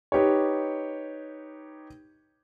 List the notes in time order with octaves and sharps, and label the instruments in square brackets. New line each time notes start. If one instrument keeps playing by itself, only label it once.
[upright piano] D#4 G4 B4 C#5